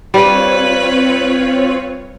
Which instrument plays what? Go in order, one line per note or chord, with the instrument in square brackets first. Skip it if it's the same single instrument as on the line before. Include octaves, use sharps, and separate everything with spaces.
[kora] G3 [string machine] C4 F4 C#5 [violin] B4